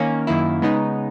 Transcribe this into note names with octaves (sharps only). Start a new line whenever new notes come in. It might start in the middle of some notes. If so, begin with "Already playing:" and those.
Already playing: D#3 A#3 C#4
F#2 D#3 A#3 E4
C#3 G#3 B3 D#4